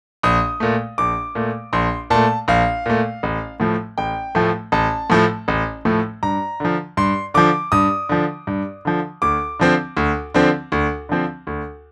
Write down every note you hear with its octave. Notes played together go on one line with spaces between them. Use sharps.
A#1 D#6
A#2 A3
A#1 D6
A#2 A3
A#1 C6
A#2 A3 A5
A#1 F5
A#2 A3
A1
A2 F3 A3
A1 G5
A2 F3 A3
A1 A5
A2 F3 A3
A1
A2 F3 A3
G2 A#5
D3 F3
G2 C6
D3 F3 D6
G2 D#6
D3 F3
G2
D3 F3
D2 D6
D3 F3 C4
D2
D3 F3 C4
D2
D3 F3 C4
D2